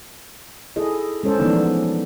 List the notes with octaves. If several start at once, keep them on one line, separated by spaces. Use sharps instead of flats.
E4 G#4 A4 D#5
G#3 C#4 A4 C5
E3 F3 A3 B3 D4 D#4